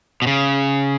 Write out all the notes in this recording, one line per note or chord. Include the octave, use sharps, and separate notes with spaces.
B2
C#3